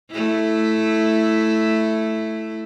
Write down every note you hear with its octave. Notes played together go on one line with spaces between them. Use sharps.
A3 E4